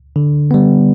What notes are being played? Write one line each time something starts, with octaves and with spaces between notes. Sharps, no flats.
D3
G3 B3